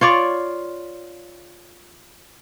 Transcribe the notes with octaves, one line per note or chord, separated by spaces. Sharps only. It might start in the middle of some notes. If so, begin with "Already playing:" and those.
F4 C#5 D5